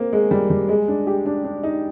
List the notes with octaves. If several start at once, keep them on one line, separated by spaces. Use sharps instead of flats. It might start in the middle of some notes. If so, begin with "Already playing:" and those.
Already playing: A#3 C4
G#3
G3
G3
G#3
D4
G4
D4
D4
D#4